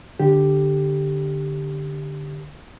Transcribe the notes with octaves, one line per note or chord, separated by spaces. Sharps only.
D3 G4